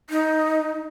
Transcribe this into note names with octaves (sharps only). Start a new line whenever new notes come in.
D#4